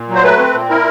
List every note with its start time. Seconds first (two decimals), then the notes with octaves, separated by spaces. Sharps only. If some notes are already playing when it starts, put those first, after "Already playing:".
Already playing: A#2
0.09 F#3
0.15 C5
0.24 A3 B4
0.39 C4
0.53 A#2
0.69 E4 A#4